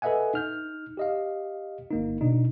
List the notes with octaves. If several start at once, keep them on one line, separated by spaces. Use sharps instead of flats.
A4 B4 D#5 E5 F#5 G#5
D#4 F6 G6
G4 D#5 F5
G1 A#3 D#4
B2 D4 D#4